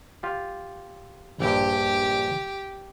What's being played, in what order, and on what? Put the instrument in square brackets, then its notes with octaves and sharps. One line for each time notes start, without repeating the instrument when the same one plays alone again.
[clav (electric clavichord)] F4 G4
[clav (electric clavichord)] A#1 G2 [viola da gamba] G4